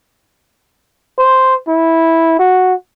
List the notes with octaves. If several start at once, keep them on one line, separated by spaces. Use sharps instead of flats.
C5
E4
F#4